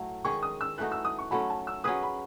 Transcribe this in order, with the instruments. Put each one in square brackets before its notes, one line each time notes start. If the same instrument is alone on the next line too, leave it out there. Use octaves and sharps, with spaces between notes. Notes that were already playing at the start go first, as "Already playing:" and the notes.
Already playing: [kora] A2 F#3 A3
[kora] D#3 G#3 C#4 G#4 [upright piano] C#6
[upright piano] D#6
E6
[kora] E3 A3 D#4 F#4 [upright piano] F#6
[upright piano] E6
D#6
C#6
[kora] F#3 A3 C#4 [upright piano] B5
[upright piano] A5
E6
[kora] F#3 C#4 G#4 B4 [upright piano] D#6
[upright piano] B5